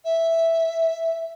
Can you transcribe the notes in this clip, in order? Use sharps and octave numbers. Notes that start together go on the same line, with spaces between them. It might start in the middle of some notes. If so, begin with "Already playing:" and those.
E5